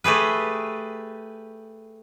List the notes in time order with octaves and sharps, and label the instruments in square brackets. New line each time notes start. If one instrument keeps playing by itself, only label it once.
[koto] A3 G4 G#4 B4